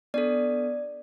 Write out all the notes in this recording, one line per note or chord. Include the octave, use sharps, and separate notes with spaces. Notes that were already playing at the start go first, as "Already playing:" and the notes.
B3 D4 A4 D5